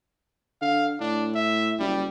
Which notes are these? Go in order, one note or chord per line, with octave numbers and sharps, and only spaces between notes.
D3 F5
A2 D4
E5
F#1 G3